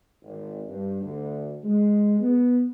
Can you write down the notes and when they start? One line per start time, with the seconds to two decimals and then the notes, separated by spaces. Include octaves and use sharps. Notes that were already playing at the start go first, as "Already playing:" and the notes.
0.23 G#1
0.69 G2
1.02 D2
1.64 G#3
2.19 B3